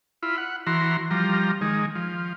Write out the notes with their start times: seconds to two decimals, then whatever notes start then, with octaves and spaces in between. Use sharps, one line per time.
0.23 E4 F4 B5
0.38 F#5
0.67 E3 F#4 A#5 C6
1.11 F3 G3 A#5
1.61 D#3 G#3
1.95 F3